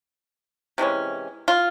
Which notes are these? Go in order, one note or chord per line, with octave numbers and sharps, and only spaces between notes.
C3 E3 G#3 C#4
F4